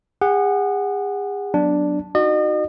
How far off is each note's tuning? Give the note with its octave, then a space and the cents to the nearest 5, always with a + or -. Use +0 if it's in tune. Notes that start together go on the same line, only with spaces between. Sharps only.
G#4 -40 F#5 +0
F#3 +0 B3 +0 D4 +0
D#4 +0 F#4 +0 D#5 -40